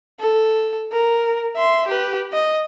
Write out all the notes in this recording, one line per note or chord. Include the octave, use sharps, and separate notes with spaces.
A4
A#4
E5 C6
G4 B4
D#5